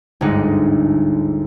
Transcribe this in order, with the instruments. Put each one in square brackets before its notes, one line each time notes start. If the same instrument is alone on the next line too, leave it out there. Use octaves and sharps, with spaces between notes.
[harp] G1 D2 G#2 G#3 D#4 F#5